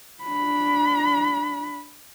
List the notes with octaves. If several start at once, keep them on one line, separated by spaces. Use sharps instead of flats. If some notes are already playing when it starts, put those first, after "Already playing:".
D4 B5